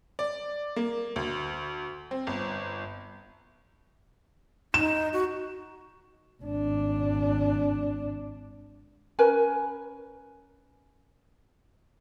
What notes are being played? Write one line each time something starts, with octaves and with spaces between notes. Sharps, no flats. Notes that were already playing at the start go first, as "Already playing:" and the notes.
D5
A#3
D2
C4
G1
D#4 E7
F#4
G#1 D4
C#4 A#4 B4 G#5